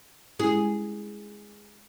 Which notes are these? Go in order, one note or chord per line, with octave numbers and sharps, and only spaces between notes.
G#3 C#4 E4 G#4